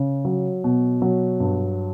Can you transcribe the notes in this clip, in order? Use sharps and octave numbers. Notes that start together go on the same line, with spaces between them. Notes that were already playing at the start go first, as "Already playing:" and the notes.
Already playing: C#3
F#3
B2
F#3
G2